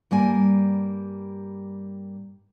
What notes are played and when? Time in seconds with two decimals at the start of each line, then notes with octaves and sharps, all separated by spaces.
0.11 G2 G3 A#3 G#5